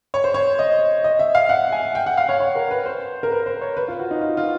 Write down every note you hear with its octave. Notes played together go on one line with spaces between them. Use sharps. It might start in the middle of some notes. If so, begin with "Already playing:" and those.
C#5
C5
C#5
D#5
D#5
E5
F5
F#5
G#5
G5
F#5
F5
C#5
C#5
A#4
B4
C5
A#4
B4
C5
C#5
B4
F4
F#4
D#4
F4
F4